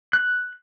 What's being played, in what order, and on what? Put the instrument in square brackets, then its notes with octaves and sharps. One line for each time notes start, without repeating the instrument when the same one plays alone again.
[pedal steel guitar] F#6